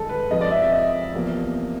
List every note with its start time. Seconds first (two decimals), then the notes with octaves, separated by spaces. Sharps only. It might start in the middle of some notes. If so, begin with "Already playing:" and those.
Already playing: G2 D#3 G#3 A4
0.09 B4
0.30 F2 C3 F3 G#3 D#5
0.41 D5
0.51 E5
0.62 E5
0.71 D#5
1.14 E2 C3 F3 A#3